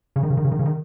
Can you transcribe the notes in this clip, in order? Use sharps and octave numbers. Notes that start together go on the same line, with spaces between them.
C#3
D#3
C#3
D#3
C#3
D#3
C#3
D#3